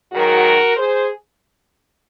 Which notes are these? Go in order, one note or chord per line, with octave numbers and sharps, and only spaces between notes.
G#2 D#3 F#3 F#4 A#4
G#4 C5